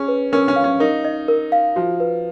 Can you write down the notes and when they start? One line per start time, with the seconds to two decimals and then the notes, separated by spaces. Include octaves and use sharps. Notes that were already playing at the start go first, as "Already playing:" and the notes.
Already playing: C#4 G#4
0.08 B4
0.32 C#4 A#4
0.48 C#4
0.56 F5
0.64 C#4
0.80 D#4 A#4
1.05 D#5
1.28 A#4
1.52 F5
1.76 F3 F#4
2.00 B4